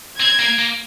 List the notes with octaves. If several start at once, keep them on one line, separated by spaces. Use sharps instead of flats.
C4 G#6
A#3
A#3